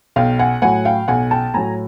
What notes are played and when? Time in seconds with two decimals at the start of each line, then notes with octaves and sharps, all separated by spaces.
0.16 B1 F5 G5
0.39 F#5 G#5
0.62 A2 F#3 F#5 G#5
0.85 F5 G5
1.08 B1 F#5 G#5
1.31 G5 A5
1.54 A2 F#3 G#5 A#5